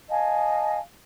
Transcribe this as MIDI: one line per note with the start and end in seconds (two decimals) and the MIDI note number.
0.09 0.79 75
0.09 0.79 77
0.09 0.79 80
0.09 0.79 81